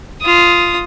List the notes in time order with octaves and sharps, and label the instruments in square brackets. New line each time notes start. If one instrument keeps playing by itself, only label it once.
[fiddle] F4 D#6